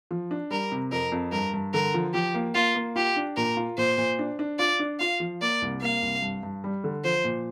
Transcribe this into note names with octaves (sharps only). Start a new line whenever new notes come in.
F3
D4
G3 A#4
C3
F2 A#4
F2
G2 A#4
G2
D3 A#4
F3
F3 G4
A#3
A#3 F4
A#3
F4 G4
D4
A#2 A#4
F4
A#2 C5
A#2
D4
D4
F4 D5
D4
F4 F5
F3
A#3 D5
C2
A#3 F5
C2
G2
G2
G3
D3
F3 C5
A#2